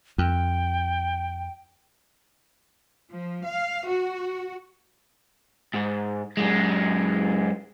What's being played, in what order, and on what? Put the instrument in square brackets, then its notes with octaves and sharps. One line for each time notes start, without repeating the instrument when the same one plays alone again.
[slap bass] F2 [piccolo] G5
[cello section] F3
F5
F#4
[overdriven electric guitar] G#2
F#2 G#3